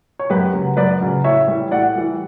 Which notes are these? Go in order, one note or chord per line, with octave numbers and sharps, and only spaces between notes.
C#5
F#2 G4 B4
C#3 F#3
F#2 B4 D5
C#3 F#3
A2 C#5 E5
E3 G3
A2 D5 F#5
E3 G3